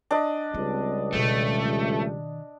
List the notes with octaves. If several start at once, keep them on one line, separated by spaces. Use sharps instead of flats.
D4 D#5
C#2 G3 C4
B2 D#3 A3